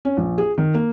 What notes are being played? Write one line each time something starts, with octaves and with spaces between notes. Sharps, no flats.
C#4
A#1
G#4
D#3
A#3